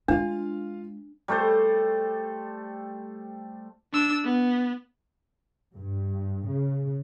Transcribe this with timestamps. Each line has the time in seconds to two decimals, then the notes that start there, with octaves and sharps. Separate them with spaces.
0.08 G#3 D4 F4 F5
1.28 G3 A3 A4 C5
3.93 D4 E6
4.24 B3
5.75 G2
6.46 C#3